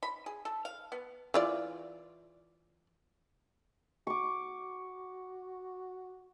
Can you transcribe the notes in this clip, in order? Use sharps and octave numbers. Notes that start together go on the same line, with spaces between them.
B5
G#4
A4
F5
B3
E3 F4 D5
F#4 C#6 D6